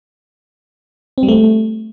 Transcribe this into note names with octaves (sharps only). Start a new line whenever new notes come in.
C4
G3
A3